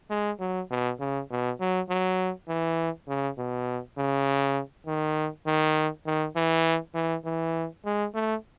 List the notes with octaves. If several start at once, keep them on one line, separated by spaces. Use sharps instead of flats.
G#3
F#3
B2
C#3
B2
F#3
F#3
E3
C#3
B2
C#3
D#3
D#3
D#3
E3
E3
E3
G#3
A3